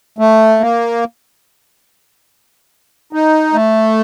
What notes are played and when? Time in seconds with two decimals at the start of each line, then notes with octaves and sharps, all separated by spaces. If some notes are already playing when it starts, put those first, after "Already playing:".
0.18 A3
0.60 A#3
3.13 D#4
3.53 A3